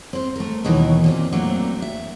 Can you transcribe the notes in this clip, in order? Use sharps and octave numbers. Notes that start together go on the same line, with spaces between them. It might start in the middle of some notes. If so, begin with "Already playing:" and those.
C4 C5
A3 A#4
D#2 B2 E3 F#3 D#4 A#4
A#2 A#3 C4
F#3 A3 A#3 C4 D4
E5